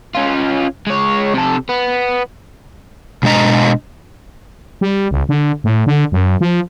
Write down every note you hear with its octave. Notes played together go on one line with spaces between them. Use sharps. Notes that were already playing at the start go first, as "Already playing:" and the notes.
C#4 F4
G#3 C#5
C3 A4
B3
B2 G#3 D4 D#5 A#5
G3
C#2
D3
A2
D3
F#2
F3